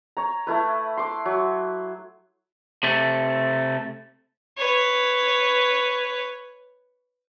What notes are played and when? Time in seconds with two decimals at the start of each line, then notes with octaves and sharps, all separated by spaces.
0.17 C#5 A#5
0.47 A3 E4 B4
0.97 C6 D6
1.25 F#3
2.83 C3 A3
4.58 B4 C#5